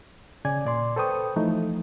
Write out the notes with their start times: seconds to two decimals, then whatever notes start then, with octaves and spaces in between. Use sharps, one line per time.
0.45 C#3 D5 G#5 G#6
0.65 A#2 D5 C6
0.96 A4 B4 C5 G5 C#6 D#6
1.36 E3 F3 A3 D#4